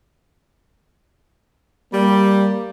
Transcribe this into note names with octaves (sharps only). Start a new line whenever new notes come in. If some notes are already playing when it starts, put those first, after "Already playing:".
G3 A#3